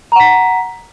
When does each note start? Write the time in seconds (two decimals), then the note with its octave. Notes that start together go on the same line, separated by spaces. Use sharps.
0.12 A#5
0.16 F#5
0.20 B6